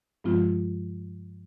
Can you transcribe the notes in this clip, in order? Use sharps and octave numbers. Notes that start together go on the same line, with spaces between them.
G2 F3 G#3 C4 F4